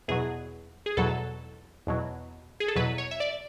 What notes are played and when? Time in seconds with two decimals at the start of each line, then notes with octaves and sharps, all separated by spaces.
0.08 E2 B2 F#3 G#4
0.86 G#4
0.97 E2 B2 F#3 A4
1.87 E2 B2 F#3
2.60 G#4
2.68 A4
2.76 E2 B2 F#3 B4
2.98 C#5
3.11 E5
3.20 D5